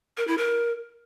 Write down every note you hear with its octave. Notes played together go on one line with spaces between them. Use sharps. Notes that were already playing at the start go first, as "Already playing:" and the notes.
A#4
E4
A#4